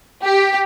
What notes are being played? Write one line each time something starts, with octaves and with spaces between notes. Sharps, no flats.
G4